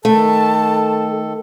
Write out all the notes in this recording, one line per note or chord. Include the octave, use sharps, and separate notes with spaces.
D#3 A3 A4 A5